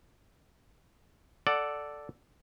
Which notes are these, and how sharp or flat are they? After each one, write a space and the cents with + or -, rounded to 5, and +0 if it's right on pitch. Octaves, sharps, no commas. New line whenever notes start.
A4 +0 D5 +0 F#5 +0